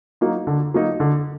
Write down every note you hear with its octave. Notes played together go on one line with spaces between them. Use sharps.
F#3 A#3 D#4
D3
F#3 A#3 D#4
D3